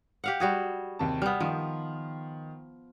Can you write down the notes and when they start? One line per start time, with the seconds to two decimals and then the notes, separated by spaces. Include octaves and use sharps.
0.24 G4 F5 F#5
0.40 G3 F#4 G#4
0.99 D#2 C3 A5
1.22 G3 B3 F6
1.40 D#3 F3